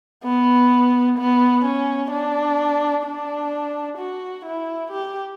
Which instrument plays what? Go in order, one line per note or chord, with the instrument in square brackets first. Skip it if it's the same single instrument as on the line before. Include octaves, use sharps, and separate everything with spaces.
[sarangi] B3
B3
C#4
D4
D4
F#4
E4
G4